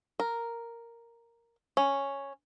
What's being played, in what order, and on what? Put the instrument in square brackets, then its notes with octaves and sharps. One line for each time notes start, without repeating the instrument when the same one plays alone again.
[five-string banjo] A#4
C#4